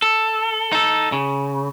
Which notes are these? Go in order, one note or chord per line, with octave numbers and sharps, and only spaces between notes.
A4
D#4 A4
C#3